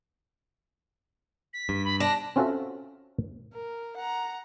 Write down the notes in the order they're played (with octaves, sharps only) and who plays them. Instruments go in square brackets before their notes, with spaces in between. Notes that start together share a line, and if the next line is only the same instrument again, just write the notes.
[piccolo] B6
[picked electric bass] G2
[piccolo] B5
[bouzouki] D4 [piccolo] A#6
[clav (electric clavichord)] C4 C#4 F4 F#4 A4 E5
[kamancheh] A#4
F#5 A#5